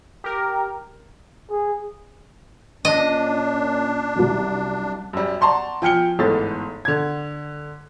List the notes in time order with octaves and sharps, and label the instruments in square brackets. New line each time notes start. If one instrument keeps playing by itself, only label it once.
[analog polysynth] G4 A#4
[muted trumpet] G#4
[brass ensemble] A#2 C#4 [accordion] D4 [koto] D#5
[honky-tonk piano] C2 F#2
[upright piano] F#2 G3
D5 F#5 A5 A#5 C6 C#6
F3 G5 G#5 F6 C#7 G7
G1 G#2 E3 A3 B3 A6
D3 G#6